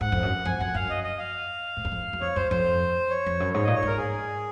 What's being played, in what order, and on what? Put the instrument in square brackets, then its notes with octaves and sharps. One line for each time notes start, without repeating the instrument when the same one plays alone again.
[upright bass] G#2 [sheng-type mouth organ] F#5
[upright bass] F2
F#2
[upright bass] F2 [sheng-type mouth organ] G#5
[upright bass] F#2 [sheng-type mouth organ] F#5
[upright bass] F#2 [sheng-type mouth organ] F5
[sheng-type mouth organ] D#5
D#5
F5
[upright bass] G#2
F#2
F2
F#2
[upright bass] F2 [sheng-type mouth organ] C#5
[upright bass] F#2 [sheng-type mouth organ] C5
[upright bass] F2 [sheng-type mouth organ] C5
[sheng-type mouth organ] C#5
[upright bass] F2
F#2
[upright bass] G#2 [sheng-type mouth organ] C#5
[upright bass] A#2 [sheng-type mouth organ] D#5
[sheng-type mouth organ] C#5
[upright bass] G#2 [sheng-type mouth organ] A#4
[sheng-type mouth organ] G#4